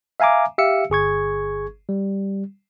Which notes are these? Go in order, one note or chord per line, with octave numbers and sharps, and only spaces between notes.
E5 F5 G#5 A#5 D6
G4 E5 F5 E6 C#7
G1 G#4 C#6 G#6
G3